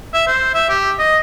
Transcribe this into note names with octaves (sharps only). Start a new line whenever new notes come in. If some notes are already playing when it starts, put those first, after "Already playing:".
E5
C5
E5
G4
D#5